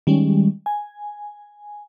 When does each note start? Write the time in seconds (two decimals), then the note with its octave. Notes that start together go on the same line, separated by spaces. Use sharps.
0.07 D#3 G3 G#3 C#4
0.66 G#5